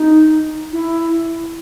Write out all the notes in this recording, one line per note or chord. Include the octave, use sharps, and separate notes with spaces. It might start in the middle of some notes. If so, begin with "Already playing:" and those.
Already playing: D#4
E4